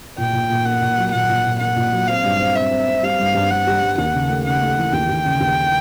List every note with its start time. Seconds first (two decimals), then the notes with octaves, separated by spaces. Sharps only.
0.18 A#2 G5
0.33 A#2
0.49 A#2
0.65 A#3 F#5
0.82 A#2
0.98 F#3
1.12 A#2 F#5
1.29 A#2
1.45 A#2
1.60 A#3 F#5
1.76 A#2
1.92 F#3
2.08 C4 F5
2.24 G2
2.40 C4
2.56 C4 E5
2.71 C4
2.87 C4
3.03 G3 F5
3.20 G2
3.35 G2
3.50 G2 F#5
3.67 G3
3.82 G2
3.98 D#2 F#5
4.14 C#3
4.29 A3
4.45 C#3 F#5
4.62 A3
4.78 E3
4.93 D#2 G5
5.09 D#2
5.25 C#3
5.40 D#2